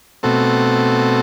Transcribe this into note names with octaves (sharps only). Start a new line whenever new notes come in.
B2 A3 C4 F#4 A4